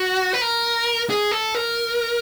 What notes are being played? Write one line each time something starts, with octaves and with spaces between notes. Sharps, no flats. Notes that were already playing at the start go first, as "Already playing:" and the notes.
Already playing: F#4
B4
A#4
G#4
A4
A#4